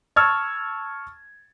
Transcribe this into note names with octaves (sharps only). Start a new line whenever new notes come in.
A5 C#6 E6 F6 G#6 A6